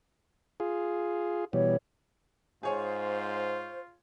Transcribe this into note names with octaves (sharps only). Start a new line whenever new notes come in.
F4 G#4
B2 E3 G3 C#5
G#2 F4 G#4 C5 C#5 G#5